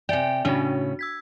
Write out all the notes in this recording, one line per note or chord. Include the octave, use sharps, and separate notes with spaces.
C3 D5 E5 G5 G#5
A2 C#3 C#4 D4 F#4
E6 G#6 B6